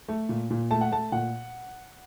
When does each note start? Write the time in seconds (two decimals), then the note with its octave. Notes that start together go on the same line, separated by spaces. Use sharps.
0.08 A3
0.29 A#2
0.50 A#2
0.71 A3 A5
0.81 F#5
0.92 A3 A5
1.12 A#2 F#5